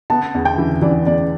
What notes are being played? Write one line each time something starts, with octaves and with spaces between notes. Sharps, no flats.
B3 A5
E2
G5
E3
E3 D5
E2 D5